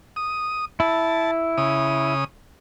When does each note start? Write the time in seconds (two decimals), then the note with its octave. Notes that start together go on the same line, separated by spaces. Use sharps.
0.16 D#6
0.80 E4 A5
1.58 C#3 D#6